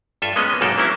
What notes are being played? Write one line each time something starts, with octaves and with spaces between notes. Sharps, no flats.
G2 F4 A4 E5
G#3 A#3 B3 C#4 B4 D#5
B1 G#2 A#3 D#4 A4 G5
F#3 A#3 C4 C#4 E4